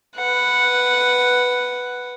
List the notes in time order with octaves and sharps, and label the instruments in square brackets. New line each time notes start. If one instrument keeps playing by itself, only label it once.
[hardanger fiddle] B4 F#5